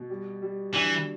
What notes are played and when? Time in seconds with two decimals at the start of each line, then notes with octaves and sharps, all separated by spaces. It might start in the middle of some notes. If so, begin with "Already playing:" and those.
Already playing: B2
0.10 G3
0.42 G3
0.74 E3 D4